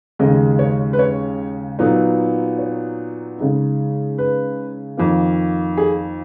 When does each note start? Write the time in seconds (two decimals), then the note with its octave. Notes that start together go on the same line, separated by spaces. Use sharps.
0.19 D#2 C#3 G#3 D#5
0.59 C#5
0.93 B4
0.99 C#5
1.79 A#2 F#3 B3 D#4
2.59 C#5
3.38 C#3 G#3 D#4
4.18 B4
4.97 F2 D#3 A#3
5.77 G#4